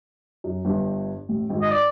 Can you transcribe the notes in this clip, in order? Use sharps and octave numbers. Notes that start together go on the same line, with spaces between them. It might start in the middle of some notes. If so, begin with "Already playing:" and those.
F#2
G1 G2
A1 A2
G#1 G#2
D#5
D5